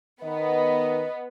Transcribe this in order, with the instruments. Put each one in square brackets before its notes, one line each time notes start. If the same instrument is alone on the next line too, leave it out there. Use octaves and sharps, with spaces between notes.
[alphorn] D#3 [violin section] B3 [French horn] D#5